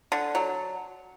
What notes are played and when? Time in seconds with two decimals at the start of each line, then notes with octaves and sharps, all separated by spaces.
0.12 D3
0.35 F#3